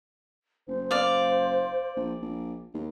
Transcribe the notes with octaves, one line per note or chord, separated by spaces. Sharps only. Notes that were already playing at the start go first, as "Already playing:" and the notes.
F#1 C5
D5 F5
A#1
A#1
D#2